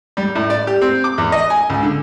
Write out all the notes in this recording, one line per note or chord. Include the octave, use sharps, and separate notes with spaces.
G3
A2
D5
G4
C4
D6
E2
D#5
G#5
C#2
D3